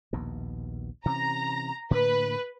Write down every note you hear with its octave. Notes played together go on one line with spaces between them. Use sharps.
A#1 D#2 B2
C3 E3 C#4 A#5
A2 D3 A#3 B4